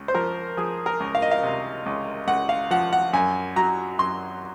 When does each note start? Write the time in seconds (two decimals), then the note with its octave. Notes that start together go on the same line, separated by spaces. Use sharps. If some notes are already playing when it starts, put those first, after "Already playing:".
Already playing: C#2
0.08 C5
0.15 F3 A#4
0.57 F3 G#4
0.86 A#4
1.00 C#2
1.15 F5
1.22 D#5
1.31 F5
1.43 C3
1.86 C#2
2.27 C#2 F#5
2.49 F5
2.71 F3 F#5
2.93 F#5
3.13 F#2 G#5
3.56 F#3 A#5
3.98 F#2 C6